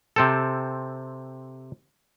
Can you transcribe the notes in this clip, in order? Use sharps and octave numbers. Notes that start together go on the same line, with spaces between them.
C3 C4 A4